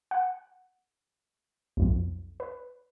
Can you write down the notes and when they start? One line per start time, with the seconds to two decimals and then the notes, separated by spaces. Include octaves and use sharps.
0.11 F#5
1.77 B1 F2
2.40 B4